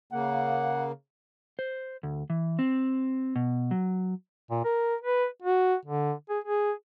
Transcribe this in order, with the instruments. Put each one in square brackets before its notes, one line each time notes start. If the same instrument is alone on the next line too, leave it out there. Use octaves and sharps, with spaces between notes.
[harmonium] C#3 A#3 [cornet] F#5
[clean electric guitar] C5
D2
E3
C4
B2
F#3
[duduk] A#2
A#4
B4
F#4
D3
G#4
G#4